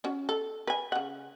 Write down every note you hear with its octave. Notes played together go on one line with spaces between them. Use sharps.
C#4 F#4
A4
B4 G#5
C#3 F#5